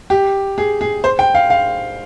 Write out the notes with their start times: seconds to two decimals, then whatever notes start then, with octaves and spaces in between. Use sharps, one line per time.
0.10 G4
0.58 G#4
0.81 G#4
1.04 C5
1.19 G5
1.35 F5
1.50 F5